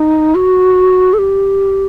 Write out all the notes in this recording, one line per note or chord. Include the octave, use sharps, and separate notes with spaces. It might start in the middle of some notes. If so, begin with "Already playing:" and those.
Already playing: D#4
F#4
A4
G4